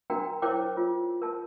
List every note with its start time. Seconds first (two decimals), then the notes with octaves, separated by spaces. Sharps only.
0.10 D4 F#4 A#4 G5 A#5
0.42 E4 A#4 C5 C#5 G5 D6
0.77 F4
1.22 A#4 A5